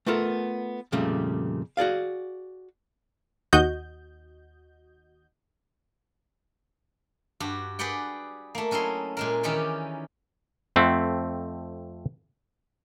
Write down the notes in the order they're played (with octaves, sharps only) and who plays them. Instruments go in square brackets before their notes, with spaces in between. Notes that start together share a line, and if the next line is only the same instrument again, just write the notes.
[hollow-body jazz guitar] A3 B3 F4 A4 A#4
F2 A#2 C#3 G3 A3
F#4 G#4 D5 F5
[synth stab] D#2 F#4 D#5 G6
[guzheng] G2 F#4 G4
G4 G#4 B4 D5 F#5 G5
A3 A#3
F#3 C#4 E4 D#5 C6
A#2 G#3 A#4
D#3 E3 C#4 D#4 G4 D5
[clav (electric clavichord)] F2 A3 C4 F#5